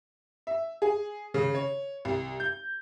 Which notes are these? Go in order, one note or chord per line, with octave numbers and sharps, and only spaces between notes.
E5
G#4
C#3
C#5
C2
G6